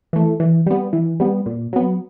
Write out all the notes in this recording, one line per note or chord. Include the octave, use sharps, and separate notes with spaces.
E3 A3
E3
G3 B3
E3
G3 B3
A#2
F#3 B3